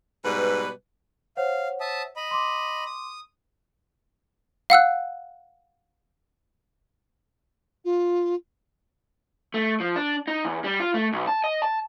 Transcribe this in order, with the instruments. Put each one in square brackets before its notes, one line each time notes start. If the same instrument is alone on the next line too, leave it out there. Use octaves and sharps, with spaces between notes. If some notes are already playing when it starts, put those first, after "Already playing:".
[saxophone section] G#2 B2 G3 B4
[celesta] C5 C#5 F#5 [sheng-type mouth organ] F5
[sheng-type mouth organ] E5 A5 D#6
D#5 B5
[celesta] C6 D6
[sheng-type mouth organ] D#6
[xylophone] F5 F#5 E6 F#6
[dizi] F4
[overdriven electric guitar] A3
F3
D4
D#4
E2
G3
F4
A3
B1
A5
D#5
A5